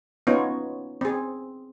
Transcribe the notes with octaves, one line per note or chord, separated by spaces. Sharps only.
B3 C#4 D#4 F4 C#5
C4 G#4